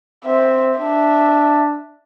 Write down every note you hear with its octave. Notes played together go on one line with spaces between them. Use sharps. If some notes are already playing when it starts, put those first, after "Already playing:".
C4 E5
D4 E5